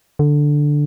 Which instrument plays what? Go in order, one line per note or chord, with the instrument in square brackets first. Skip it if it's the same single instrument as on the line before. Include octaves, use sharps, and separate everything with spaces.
[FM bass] D3